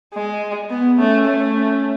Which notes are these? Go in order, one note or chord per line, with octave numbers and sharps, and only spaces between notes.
G#3
B3
A3 C#4
A3
C#4